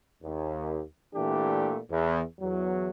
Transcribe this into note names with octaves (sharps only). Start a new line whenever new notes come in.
D#2
A#2 E3 A3 D4 G4
E2
E2 F#3